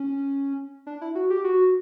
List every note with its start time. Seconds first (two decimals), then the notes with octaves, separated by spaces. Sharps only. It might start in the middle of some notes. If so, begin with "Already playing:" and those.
Already playing: C#4
0.87 D4
1.01 E4
1.15 F#4
1.30 G4
1.44 F#4